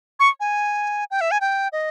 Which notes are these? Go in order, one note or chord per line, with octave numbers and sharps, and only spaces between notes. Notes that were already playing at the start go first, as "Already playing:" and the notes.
C#6
G#5
G5
E5
G#5
G5
D#5